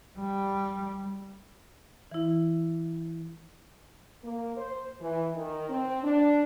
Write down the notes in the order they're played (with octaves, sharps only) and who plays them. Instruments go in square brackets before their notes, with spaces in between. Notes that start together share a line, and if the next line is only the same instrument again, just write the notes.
[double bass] G3
[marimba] E3 E4
[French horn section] A#3
C5
E3
D#3
C4
D4